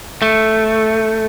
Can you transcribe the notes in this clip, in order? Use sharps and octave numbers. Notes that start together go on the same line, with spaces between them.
A3